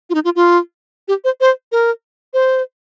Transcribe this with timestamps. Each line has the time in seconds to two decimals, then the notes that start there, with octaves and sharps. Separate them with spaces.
0.10 F4
0.15 D#4
0.25 F4
0.36 F4
1.08 G4
1.24 C5
1.41 C5
1.72 A#4
2.34 C5